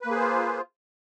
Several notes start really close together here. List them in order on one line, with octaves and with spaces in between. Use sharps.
B4 A#3 G#4 C5 F4